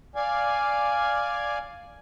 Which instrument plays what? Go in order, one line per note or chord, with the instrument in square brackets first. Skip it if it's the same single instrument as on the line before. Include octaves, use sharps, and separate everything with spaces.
[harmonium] D5 F5 G#5